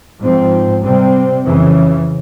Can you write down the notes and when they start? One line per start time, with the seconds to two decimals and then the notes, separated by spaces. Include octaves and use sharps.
0.20 G#2 F3 C4
0.82 C3 G3 C4
1.46 F2 C#3 E3